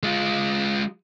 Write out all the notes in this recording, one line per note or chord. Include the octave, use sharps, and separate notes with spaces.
G#3 F4